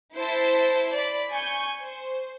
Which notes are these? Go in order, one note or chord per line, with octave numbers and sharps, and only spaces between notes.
E4 C5 A5 B6
D5 B5
G#5 C#6 G6
C5